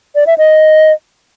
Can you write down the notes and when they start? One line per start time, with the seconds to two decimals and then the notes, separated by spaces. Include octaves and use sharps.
0.15 D5
0.27 E5
0.38 D#5